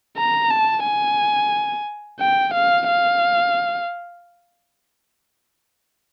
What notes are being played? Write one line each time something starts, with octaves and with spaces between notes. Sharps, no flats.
A#5
A5
G#5
G5
F5
F5